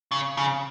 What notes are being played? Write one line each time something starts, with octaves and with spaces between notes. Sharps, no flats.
C#3
C#3